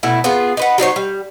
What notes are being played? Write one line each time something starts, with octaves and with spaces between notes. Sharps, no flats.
B2 A3 E4
B3 F4 G#4
D#4 B4 F#5
F#3 D#4 C5 C#5
G3